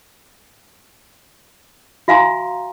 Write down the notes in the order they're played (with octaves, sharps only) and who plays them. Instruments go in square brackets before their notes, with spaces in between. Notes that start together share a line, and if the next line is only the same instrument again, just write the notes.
[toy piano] F#4 E5 F5 G#5 A#5 C6